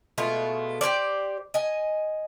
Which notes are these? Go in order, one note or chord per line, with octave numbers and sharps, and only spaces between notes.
B2 G#3 A3 F4
G4 G#4 C5 D5
D#5 G#5